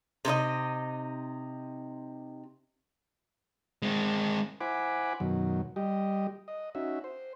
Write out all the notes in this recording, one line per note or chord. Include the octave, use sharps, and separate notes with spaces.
C3 D#4 B4 D#5
G#3 C4
E4 C5 F#5 G#5 B5 D6
F#2 B2 D#3 F#3
G3 G4 D#5
D#5
C#4 D#4 F#4 E5
C5